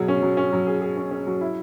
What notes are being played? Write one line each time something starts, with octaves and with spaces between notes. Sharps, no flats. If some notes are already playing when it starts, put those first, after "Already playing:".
Already playing: B2 F#3 G#4
C#4
F#3
C#4
F#3
G#4
G#4
C#4
C#4
F#3
E4